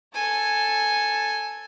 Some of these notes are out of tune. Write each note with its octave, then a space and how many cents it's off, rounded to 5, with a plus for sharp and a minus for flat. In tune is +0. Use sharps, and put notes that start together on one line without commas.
A4 +0 G#5 +0